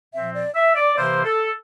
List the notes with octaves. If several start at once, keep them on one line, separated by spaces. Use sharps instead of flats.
A#2 F3 C4 E5
D5
E5
D5
C3 E3 A#3 E4 C5
A4